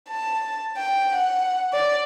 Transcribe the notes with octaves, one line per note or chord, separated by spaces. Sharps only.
A5
G5
F#5
D5